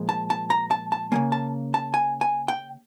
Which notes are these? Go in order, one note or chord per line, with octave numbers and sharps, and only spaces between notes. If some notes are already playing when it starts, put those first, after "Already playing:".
Already playing: A#2 F3 G#3
A5
A5
A#5
A5
A5
C#3 F3 A#3 G#5
A5
A5
G#5
G#5
G5